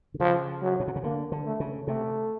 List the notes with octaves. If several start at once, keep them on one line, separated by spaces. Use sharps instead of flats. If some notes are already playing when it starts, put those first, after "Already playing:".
D3
C#3 F3
F#3
B2
C3
C#3
D3 A#3
D3
A3
C#3
C3 A3